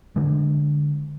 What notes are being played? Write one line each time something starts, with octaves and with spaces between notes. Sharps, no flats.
D3 G#3